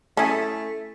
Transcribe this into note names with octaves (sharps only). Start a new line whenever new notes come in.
A3 C#4 E4 G#4 A4